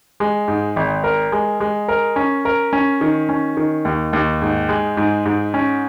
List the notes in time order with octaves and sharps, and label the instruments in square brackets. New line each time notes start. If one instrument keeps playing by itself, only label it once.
[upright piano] G#3
G#2
G#1
A#4
G#3
G#3
A#4
C#4
A#4
C#4
D#3
C#4
D#3
D#2
D#2
G#2
G#3
G#2
G#2
C#4